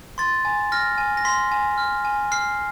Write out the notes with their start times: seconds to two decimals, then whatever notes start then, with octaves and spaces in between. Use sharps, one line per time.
0.18 C6 A6
0.45 G#5
0.72 F6 A#6
0.98 G#5
1.17 A#6
1.25 C6 B6
1.52 G#5
1.78 F6
2.05 G#5
2.32 F6 C7